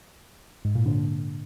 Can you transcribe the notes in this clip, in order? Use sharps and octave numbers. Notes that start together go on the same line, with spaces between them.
G#2
A#2
D3